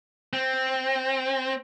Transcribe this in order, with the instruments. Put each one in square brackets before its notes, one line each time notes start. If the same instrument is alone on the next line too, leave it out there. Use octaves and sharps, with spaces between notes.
[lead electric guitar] C4